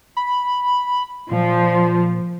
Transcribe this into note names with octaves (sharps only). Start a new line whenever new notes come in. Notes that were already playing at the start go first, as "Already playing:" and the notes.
B5
A#2 F3